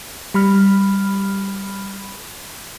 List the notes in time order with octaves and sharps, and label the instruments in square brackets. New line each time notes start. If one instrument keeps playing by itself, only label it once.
[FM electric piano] G3 B5 F6